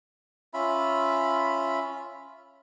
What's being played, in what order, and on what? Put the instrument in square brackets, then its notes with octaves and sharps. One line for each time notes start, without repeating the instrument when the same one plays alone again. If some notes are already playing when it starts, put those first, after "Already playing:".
[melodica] C#4 F4 E5 B5